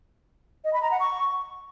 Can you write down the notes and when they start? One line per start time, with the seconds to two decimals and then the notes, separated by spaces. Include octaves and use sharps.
0.64 D#5
0.73 B5
0.82 A#5
0.91 F#5
1.00 C#6